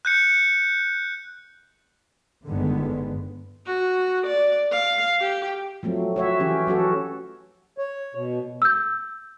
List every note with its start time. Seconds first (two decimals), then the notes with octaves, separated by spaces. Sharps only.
0.05 F#6 G6 C#7
2.48 G1 D3 D#3 G#3 B3
3.66 F#4
4.27 D5
4.72 F5
5.21 G4
5.83 F3 F#3 A3 C4
6.16 F#4 C#5 E5
6.40 E3 C#4 G4
6.67 F#3 C#4 F#4 A4
7.78 C#5
8.15 B2
8.62 E6 G6